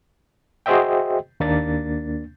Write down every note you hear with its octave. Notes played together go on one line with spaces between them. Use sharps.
F#4 G#4 C5 D#5 E5 G5
D#2 A#3 D4 A6